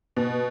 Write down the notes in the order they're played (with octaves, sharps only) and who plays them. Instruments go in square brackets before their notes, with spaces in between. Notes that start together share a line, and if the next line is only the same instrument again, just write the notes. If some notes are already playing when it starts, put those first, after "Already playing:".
[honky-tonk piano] B2